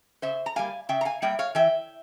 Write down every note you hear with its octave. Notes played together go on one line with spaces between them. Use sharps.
C#3 C5 E5
A#5
G3 A#3 F5 G#5
C#3 E5 G5
A#5
F5 G#5
G3 A#3 E5 G5
C#5 F5
E3 E5 G5